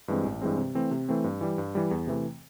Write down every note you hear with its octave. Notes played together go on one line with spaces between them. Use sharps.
G2 E3 G#3 C4
A1
G2 E3 G#3 C4
C3
E3 A3 C4
C3
E3 A3 C4
G2
E3 G3
G2
E3 G3
E2
C3 E3 A3